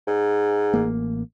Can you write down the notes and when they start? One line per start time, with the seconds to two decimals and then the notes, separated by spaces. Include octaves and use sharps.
0.07 G#2
0.74 A1 A#3